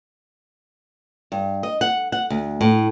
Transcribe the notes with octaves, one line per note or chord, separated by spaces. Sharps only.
G2
D#5
F#5
F#5
D2
A2